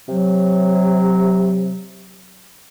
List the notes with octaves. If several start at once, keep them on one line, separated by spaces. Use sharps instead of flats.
C3 F#3